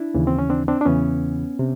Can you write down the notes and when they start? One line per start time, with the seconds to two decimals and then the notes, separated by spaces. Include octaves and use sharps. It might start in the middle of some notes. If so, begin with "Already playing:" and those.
Already playing: D4 E4
0.14 D#2 C#3 E3
0.27 C4
0.39 C#4
0.50 C4 D4
0.68 C4 D4
0.81 D4
0.85 E2 C#3 E3 B3 C#4
1.59 C3